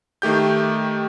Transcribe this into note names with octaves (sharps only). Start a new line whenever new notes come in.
D#3 A3 G4 G6